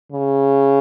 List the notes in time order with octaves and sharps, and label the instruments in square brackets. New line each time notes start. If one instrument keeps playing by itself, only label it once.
[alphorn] C#3